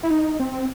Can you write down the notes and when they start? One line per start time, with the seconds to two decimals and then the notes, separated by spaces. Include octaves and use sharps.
0.03 E4
0.11 D#4
0.39 C4